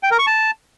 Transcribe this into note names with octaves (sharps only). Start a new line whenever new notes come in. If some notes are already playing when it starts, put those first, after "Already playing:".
G5
A#4
C#6
A5